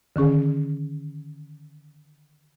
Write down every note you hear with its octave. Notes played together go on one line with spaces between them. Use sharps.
D3 D#3 C#4 G#4